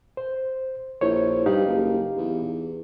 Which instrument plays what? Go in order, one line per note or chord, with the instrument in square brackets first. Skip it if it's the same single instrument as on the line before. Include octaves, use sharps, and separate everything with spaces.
[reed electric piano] C5
[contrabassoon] A#1 [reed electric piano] E4 C5 C#5
[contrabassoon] G2 [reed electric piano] D#4 G4 F5
[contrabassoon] F#1
E2